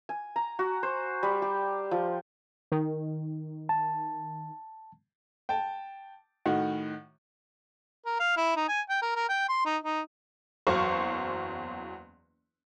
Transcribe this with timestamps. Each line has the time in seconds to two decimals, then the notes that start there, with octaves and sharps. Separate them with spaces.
0.09 G#5
0.36 A#5
0.59 F#4
0.83 C5
1.23 G3
1.42 G4
1.91 F3
2.72 D#3
3.69 A5
5.49 G5 A5
6.46 A2 D#3 F#4
8.06 A#4
8.19 F5
8.37 E4
8.56 D#4
8.68 G#5
8.89 G5
9.02 A#4
9.15 A#4
9.29 G5
9.49 C6
9.65 D#4
9.84 D#4
10.67 F#1 E2 F#3 C5 F5 C#6